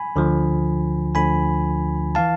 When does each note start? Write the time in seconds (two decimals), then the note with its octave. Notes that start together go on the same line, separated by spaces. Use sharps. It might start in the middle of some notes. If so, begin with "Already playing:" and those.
Already playing: G#5 B5
0.16 D2 D3 F3
1.15 D2 D3 F3 G#5 B5
2.15 E3 F5 A5